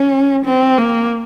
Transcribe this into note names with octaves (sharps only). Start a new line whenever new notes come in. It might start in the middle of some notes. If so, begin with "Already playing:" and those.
Already playing: C#4
C4
A#3